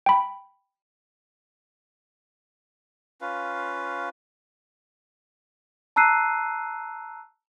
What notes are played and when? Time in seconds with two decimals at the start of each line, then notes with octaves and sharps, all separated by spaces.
0.06 G5 B5
3.21 C#4 F4 B4 F5
5.96 A5 A#5 E6 F#6 C7 D#7